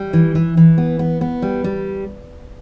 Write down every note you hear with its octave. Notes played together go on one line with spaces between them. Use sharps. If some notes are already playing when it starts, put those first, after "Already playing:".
Already playing: G3
E3
E3
E3
B3
B3
B3
G3
G3